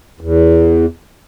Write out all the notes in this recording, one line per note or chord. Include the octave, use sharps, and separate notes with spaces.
E2